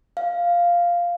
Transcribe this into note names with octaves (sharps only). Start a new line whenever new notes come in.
F5